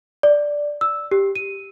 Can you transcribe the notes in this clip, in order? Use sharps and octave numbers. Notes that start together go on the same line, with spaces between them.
D5
E6
G4
D#7